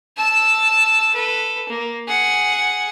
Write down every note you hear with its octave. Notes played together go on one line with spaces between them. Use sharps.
A5 E6
A4 B4
A#3
G#4 F#5